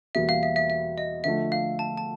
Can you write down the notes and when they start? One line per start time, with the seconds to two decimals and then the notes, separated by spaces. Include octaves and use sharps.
0.15 E2 B2 G3 A#3 E5
0.29 F5
0.43 E5
0.56 E5
0.70 E5
0.98 D#5
1.24 D3 F3 A3 E5
1.52 F5
1.79 A5
1.98 A5